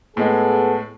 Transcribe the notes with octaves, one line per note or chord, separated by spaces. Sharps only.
A2 G#3 B3 G#4 A4